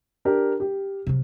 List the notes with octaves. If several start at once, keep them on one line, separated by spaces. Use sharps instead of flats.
D4 G4 A#4
G4
C3 F#3